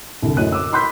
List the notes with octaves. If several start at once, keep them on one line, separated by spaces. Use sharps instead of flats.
C2 D3
F#2 A2 F#4 D#5 F#6 D#7
D6 E6
B5 C6 F#6 G6 B6